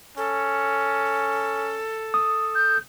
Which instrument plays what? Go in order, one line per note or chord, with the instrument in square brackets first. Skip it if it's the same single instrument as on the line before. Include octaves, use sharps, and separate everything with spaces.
[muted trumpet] C#4 [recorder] A4
[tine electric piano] D#6
[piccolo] G6